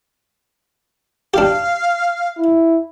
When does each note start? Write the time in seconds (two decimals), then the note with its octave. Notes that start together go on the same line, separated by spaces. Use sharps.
1.34 D4 G4 F5
2.37 E4